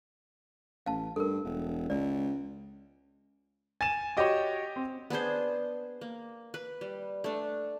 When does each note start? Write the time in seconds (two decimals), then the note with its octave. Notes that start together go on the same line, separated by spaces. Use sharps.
0.86 A1 F5 A5
1.16 G2 A4 A#4
1.45 E1
1.90 C#2 D5
3.81 G#5 A6 E7
4.17 F#4 G4 C#5 D#5 D6
4.76 C4
5.10 B3 D4 G#4 C5
6.01 A#3
6.54 B4
6.81 G3
7.24 A3 D4